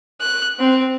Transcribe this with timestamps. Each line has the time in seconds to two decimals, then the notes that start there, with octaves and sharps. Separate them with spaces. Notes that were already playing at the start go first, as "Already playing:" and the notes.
0.21 F#6
0.59 C4